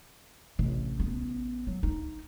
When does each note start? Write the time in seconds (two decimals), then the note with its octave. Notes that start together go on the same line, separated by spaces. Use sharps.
0.59 A1 C3
1.00 B3
1.67 F#3
1.83 D#4